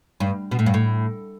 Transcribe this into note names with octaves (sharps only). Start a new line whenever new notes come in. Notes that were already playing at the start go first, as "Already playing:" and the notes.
G2
B2
A2
G2
A2